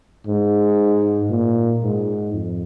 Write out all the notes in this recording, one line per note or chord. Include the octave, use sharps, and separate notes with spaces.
G#2
A#2
G#2
F2